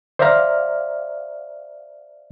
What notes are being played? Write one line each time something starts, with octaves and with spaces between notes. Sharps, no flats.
C5 D5 E5 F5 A#5 F6